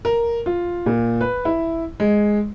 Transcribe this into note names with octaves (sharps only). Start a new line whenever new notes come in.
A#4
F4
A#2
B4
E4
G#3